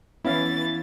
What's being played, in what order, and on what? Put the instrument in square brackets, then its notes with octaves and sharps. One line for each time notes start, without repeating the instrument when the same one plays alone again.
[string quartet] E3 A6 [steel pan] B3 C#4 F5 [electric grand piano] E4